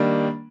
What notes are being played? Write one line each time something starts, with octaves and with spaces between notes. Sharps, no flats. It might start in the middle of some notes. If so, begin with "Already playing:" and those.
Already playing: D#3 G3 A#3 D4